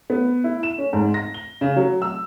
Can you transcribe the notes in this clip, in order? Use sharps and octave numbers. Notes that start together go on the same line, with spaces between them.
B3
E4
E7
C#4
G#2
A#6
G7
C#3
F#3
E6